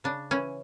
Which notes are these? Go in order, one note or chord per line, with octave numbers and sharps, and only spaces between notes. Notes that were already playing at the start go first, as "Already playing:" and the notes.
C#3 D4
E3 C#4